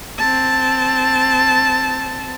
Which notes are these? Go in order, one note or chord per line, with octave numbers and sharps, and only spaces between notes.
C4 A5